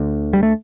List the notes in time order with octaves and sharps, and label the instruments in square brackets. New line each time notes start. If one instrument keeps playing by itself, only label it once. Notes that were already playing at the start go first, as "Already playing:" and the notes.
Already playing: [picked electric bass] D2 D3
G3
A3